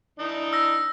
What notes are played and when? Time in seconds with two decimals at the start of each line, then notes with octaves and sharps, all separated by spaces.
0.19 E3 D4 D#4
0.53 E6 A#6